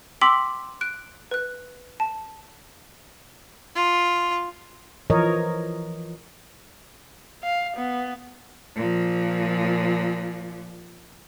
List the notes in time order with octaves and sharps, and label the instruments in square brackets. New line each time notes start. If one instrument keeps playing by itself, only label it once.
[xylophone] G5 C6 D6 E6 B6 F#7
F#6 D7
B4 F#6
A5
[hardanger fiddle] F4
[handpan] E3 F3 A#4 C#5 D#5
[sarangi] F5
B3
[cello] A#2 F3